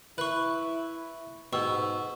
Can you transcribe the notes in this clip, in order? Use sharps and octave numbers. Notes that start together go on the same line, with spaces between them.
E4 B4 C#6 F#6
G#2 B2 C#6 E6